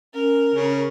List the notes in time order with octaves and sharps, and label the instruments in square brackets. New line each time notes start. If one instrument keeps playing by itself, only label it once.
[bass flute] C#4 [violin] A#4
[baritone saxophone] C#3